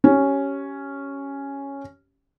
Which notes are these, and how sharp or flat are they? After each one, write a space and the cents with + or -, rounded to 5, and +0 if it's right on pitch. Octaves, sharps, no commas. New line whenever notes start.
C#4 +0 G4 -20